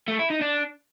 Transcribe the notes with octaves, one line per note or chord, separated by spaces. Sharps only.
A3
E4
D#4
D4